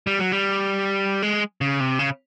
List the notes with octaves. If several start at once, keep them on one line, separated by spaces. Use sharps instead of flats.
G3
F#3
G3
G#3
C#3
C3
C#3